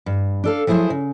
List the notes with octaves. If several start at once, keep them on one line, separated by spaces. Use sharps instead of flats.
G2
D4 A4 F5
F3 F#3 E4 G#4 C5
C#3